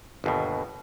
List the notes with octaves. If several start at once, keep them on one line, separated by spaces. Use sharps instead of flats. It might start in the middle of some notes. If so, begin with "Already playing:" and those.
G1 D#2 B2